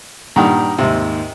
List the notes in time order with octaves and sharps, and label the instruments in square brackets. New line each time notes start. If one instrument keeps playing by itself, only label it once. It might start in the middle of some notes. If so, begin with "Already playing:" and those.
[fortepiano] G2 A#2 D#3 [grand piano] G4 F#5 A#5
[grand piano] D#2 G#2 [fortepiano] C3